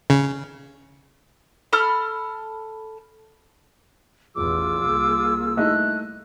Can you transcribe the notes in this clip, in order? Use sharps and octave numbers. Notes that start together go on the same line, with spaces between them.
C#3
A4 B5 F6
A1 E2 F4 G#4 D6 E6
C2 A#3
A3 D#4 E4 F#6